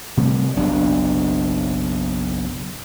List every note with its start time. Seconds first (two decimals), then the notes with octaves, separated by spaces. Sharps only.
0.17 C3 G3 A3
0.56 F#1 B1 D4